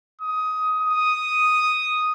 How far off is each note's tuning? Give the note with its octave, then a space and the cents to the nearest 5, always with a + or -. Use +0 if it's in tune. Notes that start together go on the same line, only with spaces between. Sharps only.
D#6 +15
D#6 +0